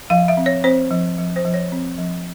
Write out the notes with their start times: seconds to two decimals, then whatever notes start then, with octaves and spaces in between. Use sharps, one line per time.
0.10 F3 F5
0.28 E5
0.37 C4
0.46 C#5
0.64 C4 C5
0.91 F3
1.18 F3
1.36 C5
1.45 F3
1.54 C#5
1.72 C4
1.98 F3